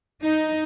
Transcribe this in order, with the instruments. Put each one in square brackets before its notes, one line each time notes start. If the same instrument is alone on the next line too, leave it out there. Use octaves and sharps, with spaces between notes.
[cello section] D#4